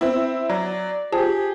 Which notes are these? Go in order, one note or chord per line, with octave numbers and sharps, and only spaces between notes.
C4 E4
F#3 D5
F4 G4 G#4 C5 A5